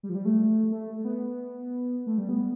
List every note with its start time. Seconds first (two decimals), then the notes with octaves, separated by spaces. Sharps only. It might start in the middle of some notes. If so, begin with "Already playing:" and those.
0.03 G3
0.09 F3
0.15 G3
0.25 A3
0.72 A3
1.05 B3
2.07 A3
2.18 G3
2.29 B3